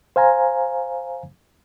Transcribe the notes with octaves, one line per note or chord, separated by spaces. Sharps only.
C5 F5 G#5 A#5